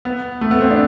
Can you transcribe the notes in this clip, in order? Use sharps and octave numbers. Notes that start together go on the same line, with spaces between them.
B3
A3
B3
C4
D4